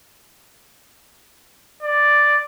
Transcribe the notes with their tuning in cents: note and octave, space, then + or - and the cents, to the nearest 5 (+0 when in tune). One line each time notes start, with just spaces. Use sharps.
D5 +0